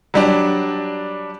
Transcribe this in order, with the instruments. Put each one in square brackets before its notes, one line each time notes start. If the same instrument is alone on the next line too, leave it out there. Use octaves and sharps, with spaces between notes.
[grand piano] F#3 G3 D4